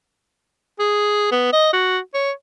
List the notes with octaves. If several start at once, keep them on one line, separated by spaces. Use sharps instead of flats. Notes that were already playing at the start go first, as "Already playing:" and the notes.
G#4
B3
D#5
F#4
C#5